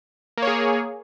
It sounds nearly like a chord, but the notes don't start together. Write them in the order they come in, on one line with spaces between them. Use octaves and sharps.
A#3 C#5 G#4